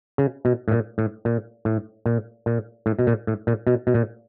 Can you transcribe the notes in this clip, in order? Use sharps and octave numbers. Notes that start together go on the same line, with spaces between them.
C#3
B2
A2
A#2
A2
A#2
A2
A#2
A#2
A2
B2
A#2
A2
A#2
B2
B2
A#2